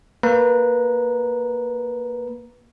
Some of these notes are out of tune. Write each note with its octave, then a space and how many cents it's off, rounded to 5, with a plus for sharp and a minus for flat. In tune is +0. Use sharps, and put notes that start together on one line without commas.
A#3 +0 B4 -15 A#5 +0